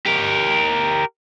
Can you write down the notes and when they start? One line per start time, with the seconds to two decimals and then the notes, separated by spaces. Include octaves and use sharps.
0.06 G4 A#4